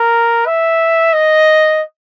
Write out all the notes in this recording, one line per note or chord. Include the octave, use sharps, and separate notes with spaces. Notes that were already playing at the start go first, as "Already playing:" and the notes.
Already playing: A#4
E5
D#5